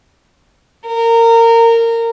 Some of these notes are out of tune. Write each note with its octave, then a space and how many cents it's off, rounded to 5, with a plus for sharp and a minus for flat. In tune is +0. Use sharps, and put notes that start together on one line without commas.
A#4 -20